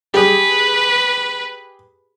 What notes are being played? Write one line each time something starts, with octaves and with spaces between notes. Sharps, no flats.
G4 G#4 B4